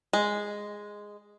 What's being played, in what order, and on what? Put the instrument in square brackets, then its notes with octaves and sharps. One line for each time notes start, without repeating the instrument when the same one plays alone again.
[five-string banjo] G#3